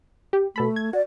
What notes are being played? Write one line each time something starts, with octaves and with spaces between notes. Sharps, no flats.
G4
B2 A3 A4 B5
G#6
F#4 D5